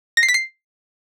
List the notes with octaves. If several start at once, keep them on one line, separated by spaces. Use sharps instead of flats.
A#6
C7
B6
C7